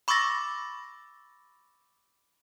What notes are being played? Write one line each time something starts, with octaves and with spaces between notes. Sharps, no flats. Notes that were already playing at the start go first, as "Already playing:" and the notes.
B5 C#6 D6 E6 A6 A#6